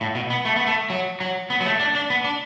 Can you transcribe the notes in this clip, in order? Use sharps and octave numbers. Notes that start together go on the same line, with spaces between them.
A2
B2
B3
A3
B3
A3
F#3
F#3
B3
F#3
A3
D4
D4
B3
D4